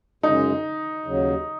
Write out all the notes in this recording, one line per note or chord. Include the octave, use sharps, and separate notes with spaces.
F#2 C#3 G#3 D#4
D#2 C#3 F#3